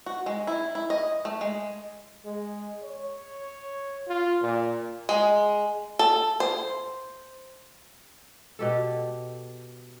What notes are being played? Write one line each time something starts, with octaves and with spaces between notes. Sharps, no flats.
F#4
G#3
E4
E4
D#5
A3
G#3
G#3
C#5
F4
A#2
G#3
A4
C5
B2 G4 A4